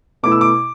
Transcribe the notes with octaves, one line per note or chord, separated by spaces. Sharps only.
B2 A3 E4 D6
E6
D6